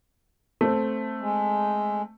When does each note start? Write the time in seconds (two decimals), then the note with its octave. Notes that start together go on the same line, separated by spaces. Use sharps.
0.61 A3 C4
1.21 G#3